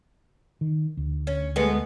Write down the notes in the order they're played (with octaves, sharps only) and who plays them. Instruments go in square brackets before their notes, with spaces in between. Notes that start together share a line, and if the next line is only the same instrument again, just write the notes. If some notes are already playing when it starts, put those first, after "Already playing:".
[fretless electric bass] D#3
D2
[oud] C#4
G#3 A3 B3